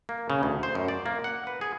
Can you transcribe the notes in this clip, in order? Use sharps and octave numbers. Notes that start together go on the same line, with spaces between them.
A#3
C#3
D2
C5
F#2
D5
A#3
F#5
B4
G#4